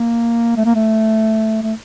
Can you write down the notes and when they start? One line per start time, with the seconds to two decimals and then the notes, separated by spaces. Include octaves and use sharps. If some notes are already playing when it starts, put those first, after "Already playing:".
Already playing: A#3
0.57 A3
0.65 A#3
0.75 A3
1.63 A3